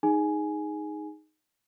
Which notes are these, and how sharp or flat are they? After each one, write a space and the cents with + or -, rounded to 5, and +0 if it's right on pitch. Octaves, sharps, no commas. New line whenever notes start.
D#4 +0 G#4 +0 G#5 +10